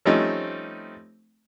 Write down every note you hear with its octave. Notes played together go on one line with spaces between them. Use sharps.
F3 G3 A3 C4 C#4 D#4